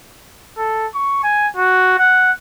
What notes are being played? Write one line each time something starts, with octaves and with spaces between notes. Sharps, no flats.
A4
C#6
G#5
F#4
F#5